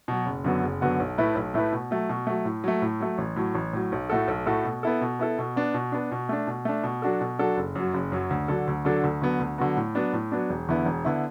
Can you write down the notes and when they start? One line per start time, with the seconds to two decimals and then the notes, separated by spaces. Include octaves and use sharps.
0.08 B2 F#3
0.26 F#1
0.44 F#2 D3 B3 F#4
0.63 F#1
0.81 F#2 D3 B3 F#4
1.00 B1
1.18 A2 A3 E4 B4
1.35 B1
1.54 A2 A3 E4 B4
1.72 B2
1.91 F#3 A3
2.09 B2
2.27 F#3 A3
2.45 A2
2.64 F#3 A3
2.82 A2
3.00 F#3 A3
3.18 A1
3.36 A2 F#3
3.55 A1
3.73 A2 F#3
3.92 B1
4.10 A2 A3 F#4 A4
4.28 B1
4.46 A2 A3 F#4 A4
4.64 B2
4.83 B3 E4 A4
5.01 B2
5.19 B3 E4 A4
5.38 B2
5.56 B3 D4
5.74 B2
5.92 B3 D4
6.11 B2
6.29 A3 D4
6.47 B2
6.65 A3 D4
6.83 B2
7.02 F#3 D4 F#4 A4
7.21 B2
7.39 F#3 D4 F#4 A4
7.57 F#1
7.75 F#2 F#3
7.94 F#1
8.12 F#2 F#3
8.30 D2
8.48 D3 F#3 D4 A4
8.67 D2
8.85 D3 F#3 D4 A4
9.04 D2
9.22 D3 F#3 B3 F#4
9.40 D2
9.58 D3 F#3 B3 F#4
9.77 A2
9.95 F#3 B3 D4
10.13 A2
10.32 F#3 B3 D4
10.50 E1
10.68 E2 D3 B3 E4
10.85 E1
11.05 D3 B3 E4